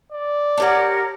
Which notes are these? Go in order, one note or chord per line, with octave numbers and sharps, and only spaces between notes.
D5
D4 G4 A#4 C#5 F#5